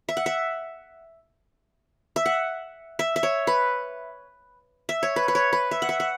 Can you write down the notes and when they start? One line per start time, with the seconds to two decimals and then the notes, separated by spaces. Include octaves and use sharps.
0.09 E5
0.17 F#5
0.26 E5
2.16 E5
2.26 F#5
2.99 E5
3.16 E5
3.23 C#5
3.47 B4
4.89 E5
5.03 C#5
5.16 B4
5.28 B4
5.35 C#5
5.53 B4
5.71 E5
5.82 F#5
5.89 E5
6.00 F#5